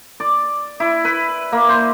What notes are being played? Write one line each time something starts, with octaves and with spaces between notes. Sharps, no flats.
D5
E4
B4
A#3
C5